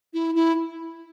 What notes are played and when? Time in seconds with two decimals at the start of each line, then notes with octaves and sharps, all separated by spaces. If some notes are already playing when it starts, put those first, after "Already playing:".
0.14 E4
0.35 E4